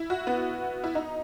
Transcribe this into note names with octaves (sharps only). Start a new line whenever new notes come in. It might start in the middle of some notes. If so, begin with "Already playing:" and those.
Already playing: E4
F#4
B3
E4
D#4